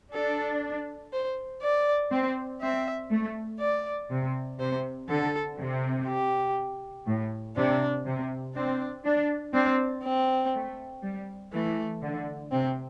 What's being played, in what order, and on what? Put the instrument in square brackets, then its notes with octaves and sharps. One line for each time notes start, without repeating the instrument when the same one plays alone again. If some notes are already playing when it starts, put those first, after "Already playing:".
[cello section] D4 [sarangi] A4
[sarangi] C5
D5
[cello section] C4
[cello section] C4 [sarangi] E5
[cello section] A3
[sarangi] D5
[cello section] C3
[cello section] C3 [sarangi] C5
[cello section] D3 [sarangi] A4
[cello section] C3
[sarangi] G4
[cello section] A2
[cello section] C3 [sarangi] D4
[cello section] C3
[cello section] C4 [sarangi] D4
[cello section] D4
[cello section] C4 [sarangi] D4
[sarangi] C4
[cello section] A3
G3
[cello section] E3 [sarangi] A3
[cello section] D3
[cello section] C3 [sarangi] C4